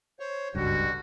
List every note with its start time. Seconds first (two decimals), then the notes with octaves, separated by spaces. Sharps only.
0.20 C5 C#5
0.55 F#1 C#2 G2 B2 D3 G3 F#4